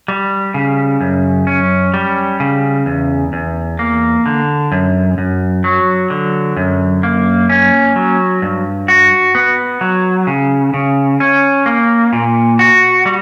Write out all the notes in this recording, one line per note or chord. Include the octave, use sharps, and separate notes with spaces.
G3
C#3
F#2
C#4
G3
C#3
E2
E2
A#3
D3
F#2
F#2
F#3
D3
F#2
A#3
C#4
F#3
G2
F#4
B3
F#3
C#3
C#3
C#4
A#3
A#2
F#4
G3